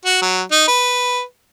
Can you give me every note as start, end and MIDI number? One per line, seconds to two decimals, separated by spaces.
0.05 0.18 66
0.21 0.42 54
0.51 0.65 63
0.67 1.22 71